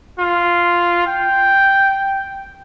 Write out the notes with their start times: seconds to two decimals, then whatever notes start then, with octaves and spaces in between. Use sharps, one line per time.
0.19 F4
1.07 G5